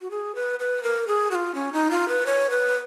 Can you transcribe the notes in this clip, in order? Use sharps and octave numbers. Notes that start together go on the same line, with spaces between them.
F#4
G#4
B4
B4
A#4
G#4
F#4
F4
C#4
D#4
F4
B4
C#5
B4